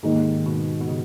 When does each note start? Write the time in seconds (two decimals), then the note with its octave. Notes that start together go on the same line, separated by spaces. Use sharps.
0.03 D#2 G#2 D#3 G#3
0.46 B2
0.80 B2
0.89 C#3